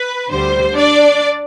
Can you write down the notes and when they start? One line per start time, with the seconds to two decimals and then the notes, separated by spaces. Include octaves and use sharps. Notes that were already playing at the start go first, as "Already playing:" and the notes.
Already playing: B4
0.29 D2 D3 G3 C5
0.75 D4 D5